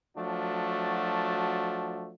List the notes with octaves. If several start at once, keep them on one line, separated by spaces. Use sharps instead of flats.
F3 F#3 A3 D4 F#4